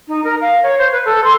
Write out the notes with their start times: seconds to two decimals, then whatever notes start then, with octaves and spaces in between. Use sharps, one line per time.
0.08 D#4
0.24 A#4
0.41 F5
0.63 C#5
0.78 C5
0.92 B4
1.05 A4
1.24 C6